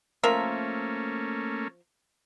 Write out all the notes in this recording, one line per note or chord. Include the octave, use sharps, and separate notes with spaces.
F3 A3 A#3 C#4 A#4 E5